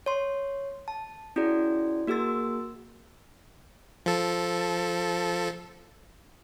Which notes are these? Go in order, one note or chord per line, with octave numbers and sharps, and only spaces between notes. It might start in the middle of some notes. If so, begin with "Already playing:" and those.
C#5 C6
A5
C#4 E4 F#4 G#4 D5
A#3 F#4 G#4 A#4 E6 A6
F3 A4